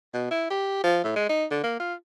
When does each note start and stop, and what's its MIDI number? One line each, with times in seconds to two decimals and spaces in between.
0.14 0.26 47
0.31 0.46 64
0.50 0.83 67
0.84 1.01 53
1.04 1.16 45
1.17 1.29 56
1.30 1.45 63
1.51 1.63 50
1.64 1.76 58
1.80 1.94 65